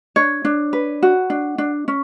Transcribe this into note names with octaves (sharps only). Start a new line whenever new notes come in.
D4 C#5
D4
B4
F#4
D4
D4
C#4